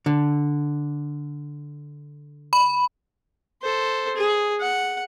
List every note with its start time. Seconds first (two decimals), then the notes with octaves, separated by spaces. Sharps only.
0.06 D3
2.53 B5
3.62 A4 C5
4.16 G#4
4.61 F#5